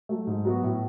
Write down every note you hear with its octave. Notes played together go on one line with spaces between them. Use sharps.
F#3 A3
G#2
F#3 B3 F#4
A2